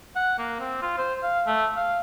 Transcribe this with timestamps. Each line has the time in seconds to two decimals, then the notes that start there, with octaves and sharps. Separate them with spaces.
0.16 F#5
0.38 A#3
0.60 C4
0.82 F4
0.98 C5
1.23 F5
1.47 A3
1.76 F5